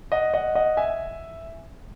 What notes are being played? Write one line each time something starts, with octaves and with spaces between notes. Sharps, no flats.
D#5 F#5
D#5 F#5
D#5 F#5
E5 G#5